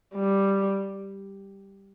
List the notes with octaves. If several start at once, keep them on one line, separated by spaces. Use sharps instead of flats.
G3